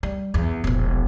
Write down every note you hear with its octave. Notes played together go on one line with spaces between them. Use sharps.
G3
E2
E1 A#1